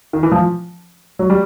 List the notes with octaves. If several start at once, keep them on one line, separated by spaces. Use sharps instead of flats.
D#3
E3
F3
F#3
G3